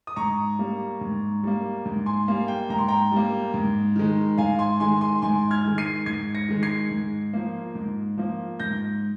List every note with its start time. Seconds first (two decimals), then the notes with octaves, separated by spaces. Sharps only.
0.07 D#6
0.16 G#2 A#5 C#6
0.59 G3 A#3
1.01 G#2
1.44 G3 A#3
1.86 G#2
2.06 G#5 C6
2.28 G3 A#3 F5
2.48 G5
2.70 G#2 A#5
2.79 C6
2.88 G5 A#5
3.12 G3 A#3
3.54 G#2
3.96 D#3 G#3
4.38 G#2 F5 G#5
4.59 G#5 C6
4.80 D#3 G#3 G#5 C6
5.01 G#5 C6
5.22 G#2 G#5 C6
5.51 F6 G#6
5.65 D#3 G#3
5.78 C7 D#7
6.06 G#2 G#6 C7
6.35 A#6 C#7
6.49 D#3 G#3
6.63 G#6 C7
6.91 G#2
7.33 F3 A#3
7.75 G#2
8.18 F3 A#3
8.60 G#2 G6 A#6